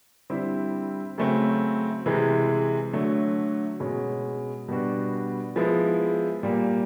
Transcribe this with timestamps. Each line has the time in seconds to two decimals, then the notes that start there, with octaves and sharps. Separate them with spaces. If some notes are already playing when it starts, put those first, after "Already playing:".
0.30 D3 G3 C4 E4
1.18 C#3 F#3 A3 C4
2.06 C3 E3 G#3
2.93 D3 F#3 A3
3.80 B2 G#3 C#4
4.68 B2 G3 B3 D4 F#4
5.56 F3 G#3 B3 E4
6.43 A#2 G3 A#3